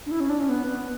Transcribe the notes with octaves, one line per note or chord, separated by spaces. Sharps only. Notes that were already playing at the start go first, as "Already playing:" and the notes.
D4
E4
C#4
D4
C#4
B3
B3